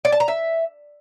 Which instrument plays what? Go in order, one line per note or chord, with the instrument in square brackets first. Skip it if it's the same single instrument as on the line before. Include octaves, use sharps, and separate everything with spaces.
[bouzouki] D5
A5
A#5
E5